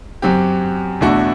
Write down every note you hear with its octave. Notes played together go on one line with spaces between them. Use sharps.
F#2 F#3 C4 G4
E2 B2 A3 D4 F#4